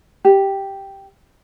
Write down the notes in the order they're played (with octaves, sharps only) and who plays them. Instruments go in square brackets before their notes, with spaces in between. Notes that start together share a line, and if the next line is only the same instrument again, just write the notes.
[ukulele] G4